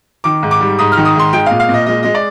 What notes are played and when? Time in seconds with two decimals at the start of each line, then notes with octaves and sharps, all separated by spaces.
0.24 D#3 D6
0.43 G#2
0.51 D6
0.61 G3
0.79 G#2 D#6
0.92 F6
0.97 D#3
1.05 D#6
1.15 G#2 C6
1.33 G#3 G5
1.46 F5
1.51 A#2
1.60 F5
1.69 A#2
1.74 D#5
1.86 G#3 D#5
2.03 G#3 D#5
2.15 D5